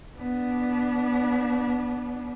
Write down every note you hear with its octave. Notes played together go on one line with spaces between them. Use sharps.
B3 D4